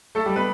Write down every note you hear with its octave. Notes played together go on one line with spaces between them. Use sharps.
A3 A4
G3 G4
B3 B4